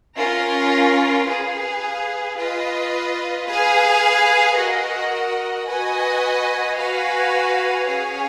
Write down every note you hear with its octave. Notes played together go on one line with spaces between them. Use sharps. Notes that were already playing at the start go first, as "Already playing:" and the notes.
C#4 F4 A#4
G#4 B4 F5
F4 B4 D#5
G#4 B4 F5 G#5
F#4 A#4 D#5 F#5
F#4 B4 D#5 G#5
F#4 B4 F5 G#5
C#4 G#4 C#5 F5 G#5